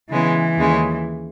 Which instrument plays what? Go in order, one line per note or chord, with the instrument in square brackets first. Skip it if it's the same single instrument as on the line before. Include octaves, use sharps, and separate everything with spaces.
[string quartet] C#3 G#3 B3 [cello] E3
[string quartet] D#2 C#3 G#3 C#4